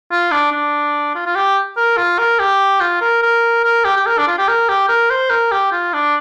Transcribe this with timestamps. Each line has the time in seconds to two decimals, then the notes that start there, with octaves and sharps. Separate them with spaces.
0.11 F4
0.31 D4
0.52 D4
1.15 F4
1.26 F4
1.35 G4
1.77 A#4
1.97 F4
2.19 A#4
2.39 G4
2.81 F4
3.01 A#4
3.23 A#4
3.64 A#4
3.85 G4
3.97 G4
4.06 A#4
4.18 D4
4.28 F4
4.38 G4
4.48 A#4
4.69 G4
4.89 A#4
5.10 C5
5.30 A#4
5.52 G4
5.72 F4
5.93 D4